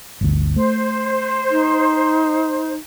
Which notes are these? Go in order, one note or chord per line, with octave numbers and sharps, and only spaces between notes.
G1 D2
A3 C5
D#4